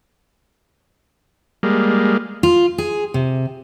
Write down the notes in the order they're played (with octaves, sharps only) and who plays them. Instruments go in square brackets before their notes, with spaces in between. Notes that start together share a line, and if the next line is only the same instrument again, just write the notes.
[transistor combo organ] G3 G#3 A#3
[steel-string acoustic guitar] F4
G#4
C3